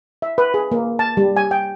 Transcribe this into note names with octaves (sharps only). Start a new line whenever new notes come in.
E5
B4
G#4
A#3
A5
G3
G#5
G5